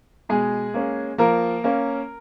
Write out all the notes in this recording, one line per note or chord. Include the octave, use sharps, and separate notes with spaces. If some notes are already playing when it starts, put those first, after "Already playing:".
B2 G#3 G#4
A#3 C#4
F3 A#3 A#4
A#3 C#4